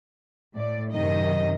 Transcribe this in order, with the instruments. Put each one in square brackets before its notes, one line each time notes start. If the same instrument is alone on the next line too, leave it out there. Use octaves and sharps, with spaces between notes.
[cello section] A2 D5
[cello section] F#2 C3 D#3 [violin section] D#5